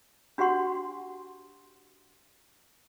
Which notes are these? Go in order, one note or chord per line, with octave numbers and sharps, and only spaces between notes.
D4 F#4 G4 F#5 C6